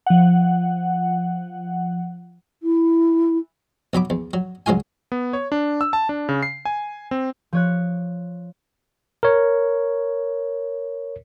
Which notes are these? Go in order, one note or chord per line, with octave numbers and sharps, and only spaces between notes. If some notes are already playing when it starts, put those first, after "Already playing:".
F3 F#5
E4
B1 F#3 B5 D6
E2
F#3
C#2 F#3 G#3 F4 G#5
B3
C#5
D4
E6
A5
D4
C#3
C7
G#5
C4
F3 C#5 F#6
A#4 C#5